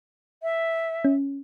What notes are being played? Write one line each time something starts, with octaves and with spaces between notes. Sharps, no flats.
E5
C#4